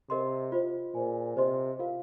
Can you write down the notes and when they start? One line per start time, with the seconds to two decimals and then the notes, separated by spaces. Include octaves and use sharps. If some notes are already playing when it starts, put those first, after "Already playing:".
0.10 C3 A#4 D#5 C6
0.52 F4 C5 D#5
0.95 A#2 G#4 C5 G#5
1.37 C3 C5 D#5 C6
1.79 F4 A#4 F5